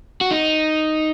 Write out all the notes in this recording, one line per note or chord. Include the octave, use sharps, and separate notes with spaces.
F#4
D#4